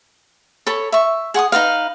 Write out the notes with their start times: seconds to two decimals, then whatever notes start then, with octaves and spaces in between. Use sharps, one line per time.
0.67 A4 C#5 B5
0.92 E5 C#6
1.34 G#4 F#5 C#6 D#6
1.52 D#4 F#4 B4 F5